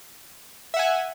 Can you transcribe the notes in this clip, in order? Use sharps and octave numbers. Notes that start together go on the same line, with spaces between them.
E5 F#5 G#5